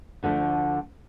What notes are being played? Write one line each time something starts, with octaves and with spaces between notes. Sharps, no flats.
D2 D3 F3 A3